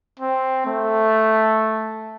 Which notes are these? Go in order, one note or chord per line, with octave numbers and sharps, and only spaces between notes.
C4
A3